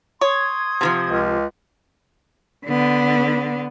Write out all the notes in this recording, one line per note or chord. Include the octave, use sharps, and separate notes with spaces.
C#5 C6 D#6 G#6
C3 E3 F3
C#2
D3 B3